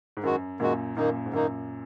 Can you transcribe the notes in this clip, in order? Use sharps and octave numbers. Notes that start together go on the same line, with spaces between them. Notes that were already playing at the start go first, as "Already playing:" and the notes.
G#2
F#2 D#3 G#3 F#4
F#2 A#2 D#3 G#3 F#4
F#2 A#2 D#3 A#3 D#4
G#2
F#2 A#2 D#3 A#3 D#4